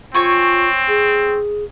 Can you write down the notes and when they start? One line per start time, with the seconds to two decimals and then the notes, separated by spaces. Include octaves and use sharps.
0.15 C4 F4 C#5 G#5 C#6
0.88 G#4